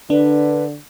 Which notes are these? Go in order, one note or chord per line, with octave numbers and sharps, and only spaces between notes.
D3 D4 B4